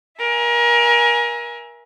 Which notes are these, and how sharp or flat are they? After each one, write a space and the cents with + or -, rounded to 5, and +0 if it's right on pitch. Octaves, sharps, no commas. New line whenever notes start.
A#4 +30 E5 +0 G#5 +0